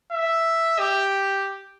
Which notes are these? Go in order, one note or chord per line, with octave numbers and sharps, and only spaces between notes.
E5
G4